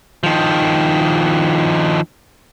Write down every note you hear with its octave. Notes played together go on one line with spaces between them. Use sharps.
D#3 F3